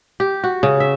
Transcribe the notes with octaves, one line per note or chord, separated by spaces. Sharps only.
G4
F#4
C#3
E5